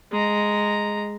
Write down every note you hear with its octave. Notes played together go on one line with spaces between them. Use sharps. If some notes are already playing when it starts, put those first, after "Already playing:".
G#3 A#5